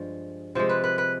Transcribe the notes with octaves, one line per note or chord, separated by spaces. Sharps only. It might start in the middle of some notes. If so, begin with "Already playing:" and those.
Already playing: G2 F3 G#3
C3 F3 G#3 C5
B4
B4
B4